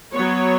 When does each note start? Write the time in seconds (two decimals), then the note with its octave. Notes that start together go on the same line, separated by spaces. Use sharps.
0.13 F#3 B3 C#5